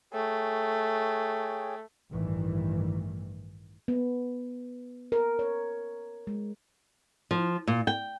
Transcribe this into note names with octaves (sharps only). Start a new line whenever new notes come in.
A3 G#4 C#5 G5
A1 G2 D#3 E3
B3
A#4
C#5
G#3
F3
A#2
G5